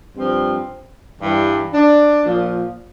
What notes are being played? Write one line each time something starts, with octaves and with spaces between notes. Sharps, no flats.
G2 F3 C4
G2 E3
D4
A#2 F3